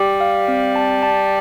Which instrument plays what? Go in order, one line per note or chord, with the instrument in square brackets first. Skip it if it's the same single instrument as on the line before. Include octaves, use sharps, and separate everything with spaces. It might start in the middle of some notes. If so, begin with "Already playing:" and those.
Already playing: [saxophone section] G3 [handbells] G4
[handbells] F5
C4
A5
A5